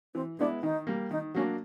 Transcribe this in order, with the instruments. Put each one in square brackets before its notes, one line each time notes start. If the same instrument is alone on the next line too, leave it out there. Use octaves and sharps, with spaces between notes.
[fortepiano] E3 [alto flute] C4
[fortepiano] G#3 B3 E4 [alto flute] D4
[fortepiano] D#3 [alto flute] D#4
[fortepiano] G3 A#3
[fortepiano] D#3 [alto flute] D#4
[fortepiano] F#3 A#3 D4 [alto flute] C#4